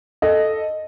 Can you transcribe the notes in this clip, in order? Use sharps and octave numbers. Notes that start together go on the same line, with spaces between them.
A4 D#5